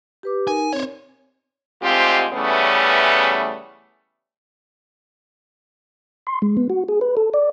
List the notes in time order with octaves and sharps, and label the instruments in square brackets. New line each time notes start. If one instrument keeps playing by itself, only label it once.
[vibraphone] G4 B4 D6
[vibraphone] D#4 A#4 [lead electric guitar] G#5
[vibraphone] C4 [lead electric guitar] C5 C#5
[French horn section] D2 G#2 G#3 C4 F4 G4
C#3 E3 G3 A3 B3 C#4
[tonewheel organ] C6
G#3
B3
F#4
G#4
B4
A4
D5